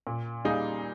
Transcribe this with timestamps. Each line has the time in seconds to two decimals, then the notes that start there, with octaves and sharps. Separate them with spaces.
0.07 A#2
0.45 G3 A#3 D#4 G#4